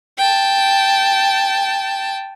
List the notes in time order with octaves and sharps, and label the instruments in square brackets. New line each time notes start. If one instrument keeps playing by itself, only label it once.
[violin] G5 A5